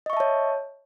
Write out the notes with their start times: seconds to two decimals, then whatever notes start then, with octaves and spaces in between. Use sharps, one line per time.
0.06 D#5
0.10 C#6
0.13 E5
0.17 A5
0.20 C#5